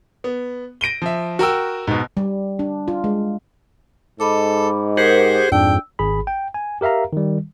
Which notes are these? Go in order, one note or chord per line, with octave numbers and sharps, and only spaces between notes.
B3
A#6 D7 D#7 G7
F3 E5
F#4 A#4 G5 E6
G#2 B2
G3
D4
F4
G#3
G#2 A4 D#5 B5 D6
G4 G#4 A#4 C5 F#5
F2 G#2 D4 G5 E6
G#1 G#4 B5
G5
G#5
G4 A#4 E5 F5 A#5
D#3 G3